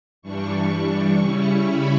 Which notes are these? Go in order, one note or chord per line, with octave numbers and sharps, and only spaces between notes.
G2 E3 G3 D4 C#6
C#3 G3 C#4 E4
B5